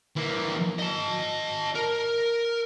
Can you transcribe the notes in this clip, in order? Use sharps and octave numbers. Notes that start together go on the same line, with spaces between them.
E3 A#3
D#5 A5
A#4